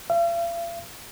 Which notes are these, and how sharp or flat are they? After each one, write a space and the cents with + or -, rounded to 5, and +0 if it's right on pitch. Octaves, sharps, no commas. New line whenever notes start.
F5 -45